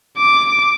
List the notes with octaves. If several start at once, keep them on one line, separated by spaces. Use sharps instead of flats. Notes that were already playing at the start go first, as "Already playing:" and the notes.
D6